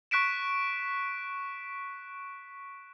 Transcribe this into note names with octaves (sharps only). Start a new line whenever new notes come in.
C#6 F#6 B6 D7 E7